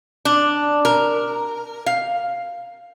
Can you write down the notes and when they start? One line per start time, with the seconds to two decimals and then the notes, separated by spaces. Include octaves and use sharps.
0.25 D4
0.85 A#4
1.86 F5